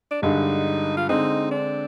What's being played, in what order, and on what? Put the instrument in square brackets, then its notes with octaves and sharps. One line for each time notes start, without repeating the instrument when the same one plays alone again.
[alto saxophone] D4
[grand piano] G2 D3 G#3 [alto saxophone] D#4
[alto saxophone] F4
[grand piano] D3 G#3 C4 [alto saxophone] D#4
[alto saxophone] D4